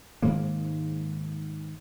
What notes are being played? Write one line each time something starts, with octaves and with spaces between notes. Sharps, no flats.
G#2 D#3 G#3 A#3